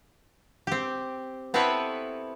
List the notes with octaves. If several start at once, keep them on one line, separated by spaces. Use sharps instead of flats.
C4 G4
B3 C4 E4 A4 B4 C#5